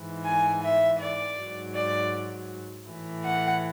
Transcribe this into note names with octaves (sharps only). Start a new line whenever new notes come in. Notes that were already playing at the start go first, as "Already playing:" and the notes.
Already playing: G#2 E3
G#5
E5
D5
G#2 F#3
D5
A2 E3
F#5